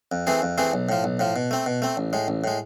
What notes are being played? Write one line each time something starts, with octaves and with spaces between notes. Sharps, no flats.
F2
E3 A3 C4 G#4
F2
E3 A3 C4 G#4
B1
A2 F3
B1
A2 F3
B2
A3 C4
B2
A3 C4
A1
A2 G#3
A1
A2 G#3